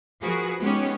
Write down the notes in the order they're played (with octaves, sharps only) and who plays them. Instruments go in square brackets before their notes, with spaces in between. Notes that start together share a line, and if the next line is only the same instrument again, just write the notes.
[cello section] F3 F#4 G#4 A#4 B4
G#3 B3 C#4 D#4 G4 C#5